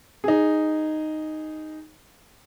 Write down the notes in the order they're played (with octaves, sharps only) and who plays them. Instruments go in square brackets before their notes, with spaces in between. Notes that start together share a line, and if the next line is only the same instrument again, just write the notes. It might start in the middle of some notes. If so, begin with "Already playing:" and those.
[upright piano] D#4 G#4